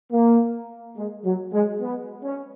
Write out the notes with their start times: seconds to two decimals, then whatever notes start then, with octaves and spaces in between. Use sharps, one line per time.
0.11 A#3
0.97 G#3
1.24 F#3
1.53 G#3
1.81 B3
2.24 C#4